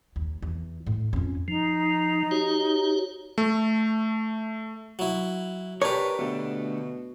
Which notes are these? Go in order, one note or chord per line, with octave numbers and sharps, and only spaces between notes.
D#2
E2
A2
F2 C#4
F3 D#4
F#4 G4 C#5
A3
F#3 E4
D4 G4 A#4 B4 C#5
B2 D3 A3